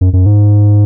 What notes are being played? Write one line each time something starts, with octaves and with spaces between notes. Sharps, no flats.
F#2
F#2
G#2